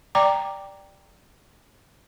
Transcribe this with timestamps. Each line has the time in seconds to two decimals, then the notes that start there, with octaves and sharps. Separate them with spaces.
0.15 D5 G5 A#5 D6